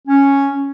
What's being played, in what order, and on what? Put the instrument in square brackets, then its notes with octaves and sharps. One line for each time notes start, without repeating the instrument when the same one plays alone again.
[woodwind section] C#4